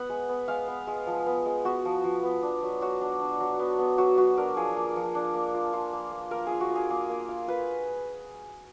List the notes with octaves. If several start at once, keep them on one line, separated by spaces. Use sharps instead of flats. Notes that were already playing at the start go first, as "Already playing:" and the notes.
Already playing: B3 F#5
G#3
B3
G#3 F5
B3
G#3
F3
B3
G#3
B3 F#4
F3
F3
B3
D4
F#3
F#3 F#4
D4
D4
F#3
B3
B3
F#3 F#4
F#3 F#4
D4 A#4
F3 G#4
A#3
F3
D4
A#3
F4
F4
A#3
A#3
A#3 A#4
F4 G#4
F#4
F4
G#4
A#3 G#4
A#3
F4
F4 B4